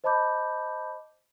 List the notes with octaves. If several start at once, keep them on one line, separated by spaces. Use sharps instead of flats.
C5 D#5 A5 B5 D6 G6